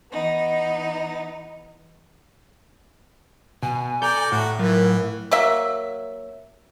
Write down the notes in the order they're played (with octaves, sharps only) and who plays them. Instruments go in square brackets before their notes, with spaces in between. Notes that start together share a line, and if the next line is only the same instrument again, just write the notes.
[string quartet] E3 B3 D#4
[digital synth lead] B2 [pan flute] G#5
[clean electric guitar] A4 A#5 [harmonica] D5 [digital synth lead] G6
[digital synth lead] A2 [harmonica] F#4
[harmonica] E3 [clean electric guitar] F#3 F4 [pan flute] A#4
[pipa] F#3 A#3 E5